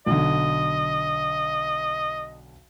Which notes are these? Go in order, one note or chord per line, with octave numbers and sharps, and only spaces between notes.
B1 D3 D#5